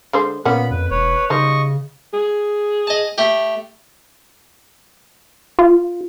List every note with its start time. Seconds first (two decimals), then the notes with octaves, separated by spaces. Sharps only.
0.13 D3 G#3 C5
0.45 A#2 A#3 B3 C#4 F#5 B5
0.71 F2 B4
0.90 E1 B4 C#5
1.30 C#3 G3 D#4 C5 D#5 C#6
2.13 G#4
2.87 D#5 A5
3.18 A3 G4
5.59 F4